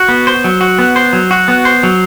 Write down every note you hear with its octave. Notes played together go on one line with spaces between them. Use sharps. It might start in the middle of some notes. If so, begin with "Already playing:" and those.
Already playing: F#4
B3
C5
F#3
F#4
B3
C5
F#3
F#4
B3
C5
F#3